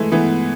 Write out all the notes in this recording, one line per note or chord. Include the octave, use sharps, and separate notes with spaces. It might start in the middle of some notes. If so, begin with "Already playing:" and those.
Already playing: E3 G#3 A3
E3 B3